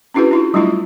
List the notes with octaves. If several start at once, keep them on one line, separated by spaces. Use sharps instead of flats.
C#4 D4 E4 F#4 G#4 B4
D4 E4 F4
F#3 G3 A3 D4 E4 F4